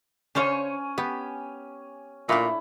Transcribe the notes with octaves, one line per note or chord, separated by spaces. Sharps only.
C#3 C#4 D4 C5 C#5 F5 G#5
B3 G4
A#2 A3 D4 E4